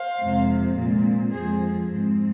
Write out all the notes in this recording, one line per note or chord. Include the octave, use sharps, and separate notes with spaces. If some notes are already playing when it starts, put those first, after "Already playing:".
Already playing: C5 F5
F2 C3 G#3 C4
A#2 G#3 C4
F2 F3 G#3 C4 G#4 C5
G#2 G#3 C4